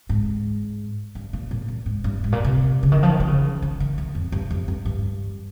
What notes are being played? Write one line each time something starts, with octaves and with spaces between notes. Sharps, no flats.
G#2
G2
A#2
A#2
A#2
G#2
G2
G#2
A#2
C3
C#3
D#3
F3
D#3
D#3
C#3
D#3
D#3
D#3
F2
G2
F2
G2
G2